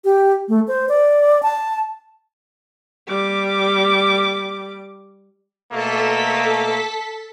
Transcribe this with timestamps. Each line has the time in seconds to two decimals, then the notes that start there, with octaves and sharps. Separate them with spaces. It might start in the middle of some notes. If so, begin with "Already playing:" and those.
0.04 G4
0.49 A3
0.68 C5
0.89 D5
1.43 A5
3.08 G3 D6
5.72 B2 A3 A#3 A4 A5 B6